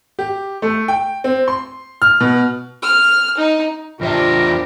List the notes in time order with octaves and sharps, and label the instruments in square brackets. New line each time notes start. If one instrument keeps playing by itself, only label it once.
[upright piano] G4
A3
G5
C4
C6
F6
B2
[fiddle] F6
D#4
[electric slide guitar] E2 C5 E5 [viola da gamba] D4 G4 [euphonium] F4 [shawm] A#4